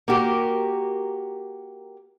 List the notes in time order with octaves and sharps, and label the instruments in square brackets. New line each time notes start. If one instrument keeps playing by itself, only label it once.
[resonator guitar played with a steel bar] A#3 F#4 G4 A#4